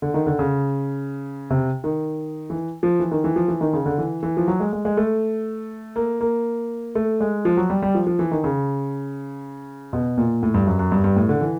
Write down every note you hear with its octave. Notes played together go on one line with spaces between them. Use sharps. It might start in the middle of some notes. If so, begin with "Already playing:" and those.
D3
D#3
D3
C#3
C3
D#3
E3
F3
E3
D#3
E3
F3
E3
D#3
C#3
D3
E3
E3
F3
F#3
G#3
G#3
G#3
A3
A#3
A#3
A3
G#3
F3
F#3
G3
G3
F3
F3
E3
D#3
C#3
B2
A#2
A2
G2
F#2
F#2
G2
G2
A2
D3
E3